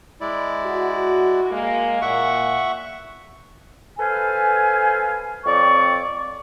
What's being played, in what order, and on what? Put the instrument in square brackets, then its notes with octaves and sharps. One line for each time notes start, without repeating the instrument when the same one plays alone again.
[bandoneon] G#3 E4 D5
[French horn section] F#4
G#3 A#3
[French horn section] A#2 [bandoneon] E5 F#5 C#6
[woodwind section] A4 B4 C5 F5 G#5
F2 C4 C#5 D5 C#6